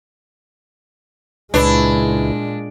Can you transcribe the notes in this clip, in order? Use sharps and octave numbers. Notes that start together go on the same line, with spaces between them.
C#2 A#2 G#3 D4 E4 B4 C#5